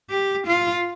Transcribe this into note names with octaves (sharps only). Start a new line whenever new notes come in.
G4
F4